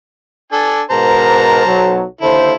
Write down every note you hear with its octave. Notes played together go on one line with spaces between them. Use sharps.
D4 A4 G#5
G#2 B2 A#4 C5 A5 A#5
B1 F#3
D#2 D3 E4 A4 C5